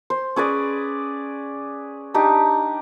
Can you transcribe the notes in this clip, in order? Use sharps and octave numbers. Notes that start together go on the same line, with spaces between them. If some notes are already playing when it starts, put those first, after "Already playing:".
C5
C#4 G#4 B4 D5
D4 D#4 G4